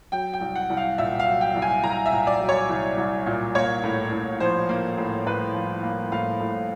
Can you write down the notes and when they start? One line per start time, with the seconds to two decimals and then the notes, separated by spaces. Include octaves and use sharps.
0.12 F#3 G5
0.33 G5
0.41 C2
0.55 F#5
0.70 C2
0.77 F5
0.98 A#2 E5
1.20 F5
1.27 F#3
1.41 G5
1.56 C2
1.62 G#5
1.84 C2 A#5
2.06 E5
2.12 A#2
2.27 D5
2.41 F#3
2.49 C#5
2.69 C2
2.97 C2
3.27 A#2
3.55 A#3 C#5
3.84 A2
4.12 A2
4.40 F3 C5
4.69 A#3
4.98 A2
5.26 A2 B4
5.55 F3
5.83 A#3
6.12 A2 F5
6.41 A2